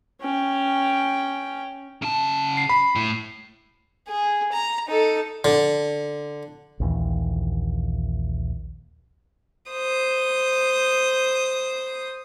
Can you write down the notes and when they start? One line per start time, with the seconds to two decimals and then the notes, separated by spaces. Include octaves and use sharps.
0.21 C#4 G5
2.02 C#3 A5
2.57 C7
2.69 B5
2.96 A2
4.09 G#4
4.53 A#5
4.87 D#4 A4
5.44 D3
6.80 A#1 D#2 E3
9.72 C5 D#6